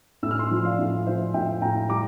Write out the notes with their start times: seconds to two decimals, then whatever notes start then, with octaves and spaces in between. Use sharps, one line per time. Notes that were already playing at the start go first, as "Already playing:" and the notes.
0.23 A2 E6
0.31 F6
0.39 C6 E6
0.51 F3
0.65 D5 F5
0.79 A2
1.06 F3 C5 E5
1.34 A2 E5 G5
1.61 A2 G5 A#5
1.89 G3 A#5 D6